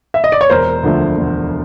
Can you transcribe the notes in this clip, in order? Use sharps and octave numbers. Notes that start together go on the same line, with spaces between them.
E5
D#5
D5
C#5
E1 A#4 C5
D2 D3 F3 A3
E1